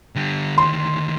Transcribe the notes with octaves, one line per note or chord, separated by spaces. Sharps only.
D3 G3
D2 D#3 C6